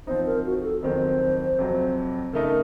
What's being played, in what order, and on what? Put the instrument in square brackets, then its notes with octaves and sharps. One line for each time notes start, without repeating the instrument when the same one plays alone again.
[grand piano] F3 C4 D#4 [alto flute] C5
[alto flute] A#4
F#4
F#4
A4
[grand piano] F2 D#3 F#3 C4 [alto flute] C5
[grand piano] F2 C3 F#3
[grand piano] C#3 A3 D#4 [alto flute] A#4